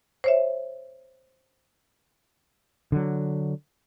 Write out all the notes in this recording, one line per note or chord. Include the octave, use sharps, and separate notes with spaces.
C5 C#5 E5
D3 F#3